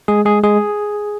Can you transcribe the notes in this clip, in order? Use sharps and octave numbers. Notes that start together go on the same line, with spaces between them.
G#3 G#4
G#3 G#4
G#3 G#4